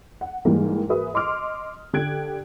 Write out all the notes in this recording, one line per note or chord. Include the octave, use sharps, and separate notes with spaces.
F#5
G#2 E3 G3 G#3 A#3
F#4 G#4 A#4 B4 E5 D#6
D#5 C6 D6 F6
D3 G4 F#6 G#6 D7